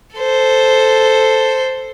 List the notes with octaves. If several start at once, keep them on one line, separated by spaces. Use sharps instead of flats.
A4 C5